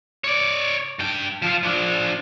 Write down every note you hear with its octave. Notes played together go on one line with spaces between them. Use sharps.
C#5 D5
G2 G5
F3 F5
F3 D4